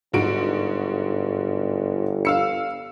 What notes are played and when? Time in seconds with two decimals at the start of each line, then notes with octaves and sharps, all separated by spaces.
0.13 G1 G#2 F#4 D7
2.25 F5 E6 C#7